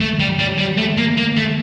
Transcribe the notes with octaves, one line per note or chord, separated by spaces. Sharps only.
A3
G3
G3
G3
A3
A#3
A#3
A3